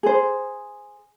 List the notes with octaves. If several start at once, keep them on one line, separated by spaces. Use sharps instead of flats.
G#4 C5